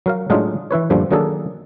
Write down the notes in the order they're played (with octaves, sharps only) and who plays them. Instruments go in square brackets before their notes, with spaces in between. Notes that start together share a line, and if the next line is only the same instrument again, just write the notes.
[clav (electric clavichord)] F#3 A#4 F5
A2 F#3 G#3 D4 D#4 F4
E3 E4 B4 C#5
F#2 A#2 D3 F3 G3
D#3 F#3 A#3 D4 G#4 A4